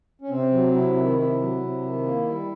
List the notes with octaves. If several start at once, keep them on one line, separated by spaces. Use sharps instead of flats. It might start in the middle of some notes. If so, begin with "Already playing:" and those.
C#4
C3 C4
F#3
C3 E4
D#3
C3 E4
F#3
C3
D#3
A#3
G3